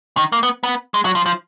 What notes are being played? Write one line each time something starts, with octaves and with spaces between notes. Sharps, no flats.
D#3
A#3
B3
B3
G#3
F#3
F3
F3